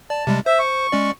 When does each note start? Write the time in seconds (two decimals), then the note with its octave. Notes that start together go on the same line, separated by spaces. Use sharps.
0.10 D5 A5
0.27 C3 G3 G#3
0.46 C5 E5
0.59 C#6
0.92 G#3 C#4 D5